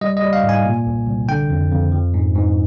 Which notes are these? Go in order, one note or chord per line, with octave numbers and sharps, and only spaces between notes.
G3 D#5
D#5
G3
F5
G#2
G#5
A#2
C2
C2
D3 G5
F2
F2
F3
G#2
G#2